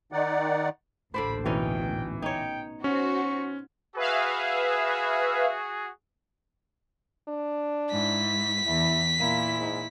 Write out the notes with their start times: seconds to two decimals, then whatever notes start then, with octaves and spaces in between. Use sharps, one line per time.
0.12 D#3 D#4 D5 F#5
1.14 A1 D2 A#2 D3 D4 C5 B5
1.45 B2 E3 C#4 D#4 G5
2.22 D#4 C#5 G5
2.84 C#4 F#4 C5 C#6
3.96 F#4 G#4 B4 E5 F5
7.28 D4
7.92 G#2 E4 B6
8.66 E2 E4
9.19 A#2 A#3 E4
9.58 G#2